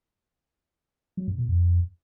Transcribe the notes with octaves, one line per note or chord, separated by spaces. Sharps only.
F#3
G2
B2
F2